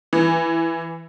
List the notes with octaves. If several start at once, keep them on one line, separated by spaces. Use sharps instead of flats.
E3